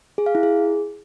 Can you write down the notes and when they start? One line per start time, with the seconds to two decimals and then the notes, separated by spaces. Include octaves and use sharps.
0.18 G#4
0.26 F5
0.35 E4
0.43 G#4